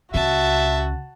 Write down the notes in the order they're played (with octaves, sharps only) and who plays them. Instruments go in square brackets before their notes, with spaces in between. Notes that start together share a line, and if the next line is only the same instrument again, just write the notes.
[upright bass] C#2 C#3 [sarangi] F#4 [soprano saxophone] E5 [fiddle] A5